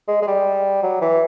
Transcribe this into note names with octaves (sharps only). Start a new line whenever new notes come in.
G#3
G#3
G3
F#3
E3